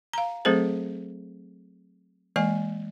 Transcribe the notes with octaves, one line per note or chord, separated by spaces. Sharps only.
F5 A#5
F#3 A3 C4 G#4 A4 C5
E3 G#3 A#3 D#5 G#5